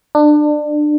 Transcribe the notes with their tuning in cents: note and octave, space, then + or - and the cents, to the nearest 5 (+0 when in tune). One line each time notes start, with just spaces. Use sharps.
D4 +25